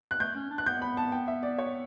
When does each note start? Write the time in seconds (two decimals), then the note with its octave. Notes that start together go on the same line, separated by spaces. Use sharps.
0.11 F#6
0.20 A3 G6
0.35 C#4
0.50 D4
0.58 F#6
0.66 B3 G6
0.82 B5
0.97 A5
1.12 G5
1.28 E5
1.43 D5
1.58 C#5